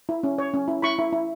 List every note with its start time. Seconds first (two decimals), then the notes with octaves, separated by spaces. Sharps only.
0.09 E4
0.23 C#4
0.38 C#5
0.54 C#4
0.68 E4
0.82 E4 B5 C#6
0.99 E4
1.13 E4